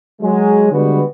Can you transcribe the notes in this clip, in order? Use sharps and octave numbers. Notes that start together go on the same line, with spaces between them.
F#3 G#3
D3 G3 G#3 B3 F#4 B4